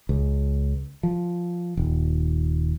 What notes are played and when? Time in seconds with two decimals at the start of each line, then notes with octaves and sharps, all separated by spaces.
0.09 C#2
1.03 F3
1.77 D#1